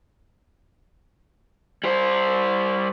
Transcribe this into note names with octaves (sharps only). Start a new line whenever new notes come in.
G3 C5